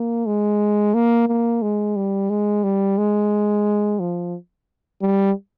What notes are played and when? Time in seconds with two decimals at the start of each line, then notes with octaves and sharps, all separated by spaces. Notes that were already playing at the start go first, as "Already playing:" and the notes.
Already playing: A#3
0.26 G#3
0.94 A#3
1.28 A#3
1.62 G#3
1.96 G3
2.30 G#3
2.63 G3
2.98 G#3
3.99 F3
5.01 G3